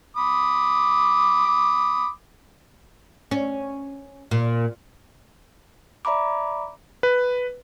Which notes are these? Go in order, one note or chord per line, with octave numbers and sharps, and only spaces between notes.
B5 D6 D#6
C#4
A#2
D5 E5 A#5 B5 D6
B4